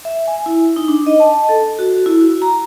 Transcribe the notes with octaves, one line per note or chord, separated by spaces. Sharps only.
E5
G#5
E4
D#4
D4
D#5
A5
A4
F#4
E4
F#4
A#5